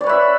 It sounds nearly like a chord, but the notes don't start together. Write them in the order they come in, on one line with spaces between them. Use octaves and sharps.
D5 C#5 B4 E5